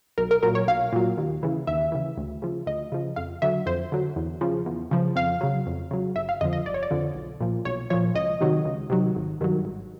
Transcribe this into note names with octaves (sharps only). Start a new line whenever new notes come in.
B1 A#4
A#4
A#2 F#3 A#4
C#5
B1 F5
A#2 F#3
D#2
C#3 E3
D#2 E5
C#3 E3
D2
C#3 F3
D2 D#5
C#3 F3
F2 F5
D3 F#3 E5
F2 C5
D3 F#3
E2
C#3 F3
E2
C#3 F3
F2 F5
C#3 F#3
F2
C#3 F#3
G1 E5
F5
F2 D3 F3 D#5
D#5
G1 D5
C#5
D5
F2 D3 F3
B1
A#2 F3
B1 C#5
A#2 F3 C#5
C#2 D#5
C3 D#3 F#3
C#2
C3 D#3 F#3
G#1
G2 D#3 F#3
G#1